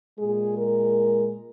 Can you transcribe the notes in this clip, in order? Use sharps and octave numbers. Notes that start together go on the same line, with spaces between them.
A#2 G#3 G#4
A#4